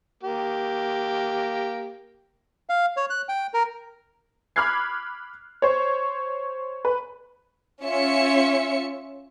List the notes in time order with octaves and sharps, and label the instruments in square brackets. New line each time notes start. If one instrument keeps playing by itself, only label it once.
[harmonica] A#3 G4
[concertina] F5
C#5
F#6
G5
A#4
[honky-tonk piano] B5 D6 F6 F#6 G#6 C7
C5 C#5
B4
[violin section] C#4 F4 E5 C#7